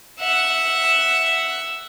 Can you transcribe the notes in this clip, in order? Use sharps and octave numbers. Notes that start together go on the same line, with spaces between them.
E5 F#5